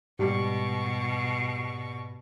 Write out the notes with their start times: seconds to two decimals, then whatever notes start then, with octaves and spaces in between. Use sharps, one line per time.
0.19 G#2 B2 G3 C#6